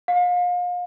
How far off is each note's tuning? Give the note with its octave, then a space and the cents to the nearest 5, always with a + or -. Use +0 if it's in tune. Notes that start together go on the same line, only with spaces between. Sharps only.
F5 +35